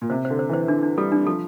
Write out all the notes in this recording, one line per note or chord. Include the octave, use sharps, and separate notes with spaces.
A#2
C3 C5
C5
D3
C5
E3 C5
E3 D4
D4
G3 A4
D4
F3 A4